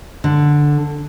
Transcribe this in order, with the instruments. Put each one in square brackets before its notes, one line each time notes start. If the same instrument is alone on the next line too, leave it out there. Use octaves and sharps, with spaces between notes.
[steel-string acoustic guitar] D3